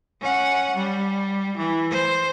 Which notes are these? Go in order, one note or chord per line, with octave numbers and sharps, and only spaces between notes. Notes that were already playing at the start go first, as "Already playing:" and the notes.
C#4 F#5
G3
E3
C5